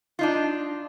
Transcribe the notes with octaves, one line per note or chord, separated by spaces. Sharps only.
D4 D#4 F4